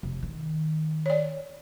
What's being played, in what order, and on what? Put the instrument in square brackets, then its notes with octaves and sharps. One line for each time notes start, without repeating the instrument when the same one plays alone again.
[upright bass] F1
D#3
[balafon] C#5 D5